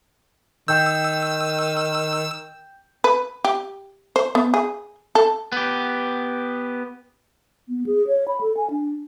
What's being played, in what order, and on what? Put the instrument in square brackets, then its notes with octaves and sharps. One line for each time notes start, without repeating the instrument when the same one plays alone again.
[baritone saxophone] D#3 [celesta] G5 G6 [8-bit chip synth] E6
[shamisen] B4
G4
C5
B3
G#4
A4
[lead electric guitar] B3 G4
[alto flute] B3
G#4
C#5
B5
A4
G#5
D4